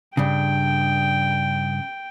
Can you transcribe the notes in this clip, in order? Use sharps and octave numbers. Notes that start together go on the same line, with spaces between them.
G2 C#3 G5